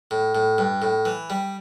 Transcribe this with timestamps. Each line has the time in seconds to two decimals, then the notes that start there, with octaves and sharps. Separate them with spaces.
0.11 A2
0.35 A2
0.58 G2
0.82 A2
1.05 E3
1.30 G3